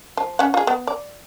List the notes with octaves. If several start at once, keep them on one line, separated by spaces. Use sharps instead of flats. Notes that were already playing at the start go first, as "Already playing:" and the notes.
F3
C#4 F#5
F4 G#4
B3
D5